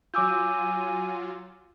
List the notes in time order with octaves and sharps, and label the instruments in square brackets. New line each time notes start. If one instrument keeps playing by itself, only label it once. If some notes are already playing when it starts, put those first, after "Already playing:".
[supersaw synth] F#3 F4 [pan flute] G#5 [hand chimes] D6 E6 G6